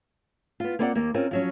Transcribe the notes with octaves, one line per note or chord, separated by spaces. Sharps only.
B3 F4
A#3 C4 E4 F4 D5 F#5
D#2 A#3
C4 C#4 F4 A#4
F3 F#3 C#4